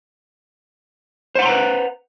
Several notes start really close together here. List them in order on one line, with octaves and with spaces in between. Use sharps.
C5 F#5 C6 A#5 B4